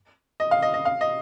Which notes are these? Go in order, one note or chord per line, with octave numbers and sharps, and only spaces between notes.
D#5
F5
D#5
D#5
F5
D#5